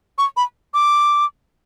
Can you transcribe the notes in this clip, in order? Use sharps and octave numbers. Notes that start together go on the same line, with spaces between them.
C#6
B5
D6